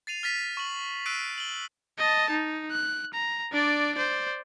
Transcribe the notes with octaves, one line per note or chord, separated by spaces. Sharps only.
A6 C7 D#7 F7
F6 A6 B6 D#7
C#6 F#7
E6 F#6 B6 C7 D7 D#7
F#7 G7
D#5 A5
D#4
F#6
A#5
D4 D5
C5 D5